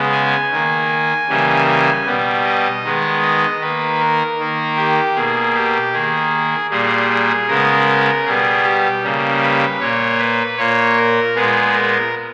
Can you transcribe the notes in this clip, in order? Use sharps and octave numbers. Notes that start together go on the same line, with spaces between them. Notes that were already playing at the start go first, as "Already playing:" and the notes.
Already playing: C#3 G#3 B3
G#5
D#3 A#3
C#3 E3 G3 A#3
G#5
B2 G3 B3
D#5
D#3 G#3 B3
D#5
D#3 A#3 B4
A#4
D#3 A#3
G4
B2 A#3 G#4
G4
D#3 A#3 G#4
A#2 G3 A#3 G#4
G#4
C#3 G#3 B3 A#4
B2 G3 B3 G#4
G4
C#3 G3 A#3
B4
A#2 A#3 C#5
B4
A#2 A#3 C#5
A#4
A#2 G#3 B3 G#4
A#4